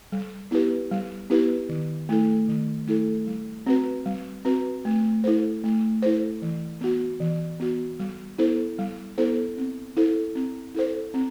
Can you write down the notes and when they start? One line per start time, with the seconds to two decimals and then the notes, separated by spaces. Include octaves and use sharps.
0.12 G3
0.51 B3 E4 G4 B4
0.91 G3
1.30 B3 E4 G4 B4
1.69 D#3
2.09 A3 E4 A4
2.48 D#3
2.87 A3 E4 A4
3.27 G3
3.66 C4 F#4 B4
4.06 G3
4.45 C4 F#4 B4
4.85 A3
5.24 E4 A4 C5
5.64 A3
6.02 E4 A4 C5
6.42 E3
6.81 B3 F#4
7.20 E3
7.60 B3 F#4
8.00 G3
8.38 B3 E4 A4 C5
8.79 G3
9.18 B3 E4 A4 C5
9.57 C4
9.97 E4 A4 C5
10.35 C4
10.74 E4 A4 C5
11.14 C4